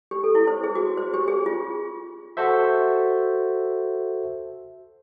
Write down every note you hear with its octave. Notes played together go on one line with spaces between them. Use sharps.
G4
A4
E4
C5
G#4
F#4
C5
G4
G#4
F4
F#4 A4 C5 E5